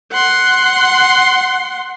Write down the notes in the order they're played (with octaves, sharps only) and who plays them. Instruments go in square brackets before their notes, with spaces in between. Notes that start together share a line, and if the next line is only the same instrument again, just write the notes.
[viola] F#5 C6